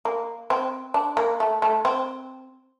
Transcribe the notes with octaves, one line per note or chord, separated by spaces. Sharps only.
A#3
C4
D4
A#3
A3
A3
C4